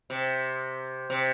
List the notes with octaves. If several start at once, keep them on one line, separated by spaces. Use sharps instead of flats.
C3
C3